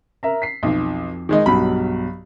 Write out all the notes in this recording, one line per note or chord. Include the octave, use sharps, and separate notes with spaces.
A#4 E5 A#5
B6 C7
B1 F2
D#3 G#3 D#4
B1 G2 F#3 B5